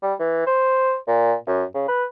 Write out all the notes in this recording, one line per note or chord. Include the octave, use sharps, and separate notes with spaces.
G3
E3
C5
A#2
F#2
C#3
B4